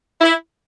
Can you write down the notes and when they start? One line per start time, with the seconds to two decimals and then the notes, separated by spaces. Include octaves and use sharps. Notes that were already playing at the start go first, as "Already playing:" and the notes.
0.21 E4